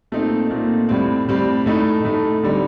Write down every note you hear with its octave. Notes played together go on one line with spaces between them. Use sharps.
A#2 A3 C4 D#4
A#2 A3 C4 D#4
A2 G3 C4
A2 G3 C4
A2 A3 D#4
A2 A3 D#4
D3 G3 C4 D#4